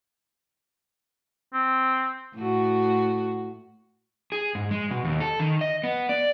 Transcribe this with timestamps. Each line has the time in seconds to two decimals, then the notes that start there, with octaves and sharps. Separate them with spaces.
1.54 C4
2.35 A2 F#4
4.32 G#4
4.55 G#2
4.71 G#3
4.91 B2
5.04 D#2
5.20 A4
5.40 D#3
5.61 D#5
5.84 B3
6.09 D5